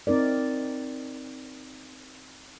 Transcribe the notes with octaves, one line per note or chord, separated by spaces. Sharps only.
C4 D#4 A#4 D5